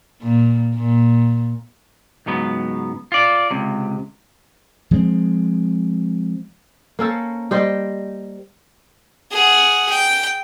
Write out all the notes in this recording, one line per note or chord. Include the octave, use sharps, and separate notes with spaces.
A#2
A#2
C#2 G#2 F#3 B3
F4 D5
C#2 C3
F3 G#3 A#3 C4
A#3 C#4 A4 C5
G3 G4 C5 D#5
G#4 F#5
G5